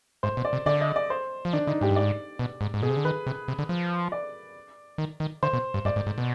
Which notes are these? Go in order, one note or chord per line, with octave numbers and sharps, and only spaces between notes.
G#2 C5
B2
D5
C3
D3 D5
D#5
D5
C5
F3
D#3 D4
D3 D#4
G#2 G4
G2
G#2 D5
B2
G#2
G#2
B2 G#4
C3
D3
D#3 B4
C3
C3
D3
F3
D5
D#3
D#3
D3 C5
B2
G2
G2 D5
G#2
G#2
B2